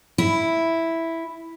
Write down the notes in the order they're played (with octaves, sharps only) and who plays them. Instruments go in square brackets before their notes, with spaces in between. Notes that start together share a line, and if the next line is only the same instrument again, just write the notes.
[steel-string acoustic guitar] E4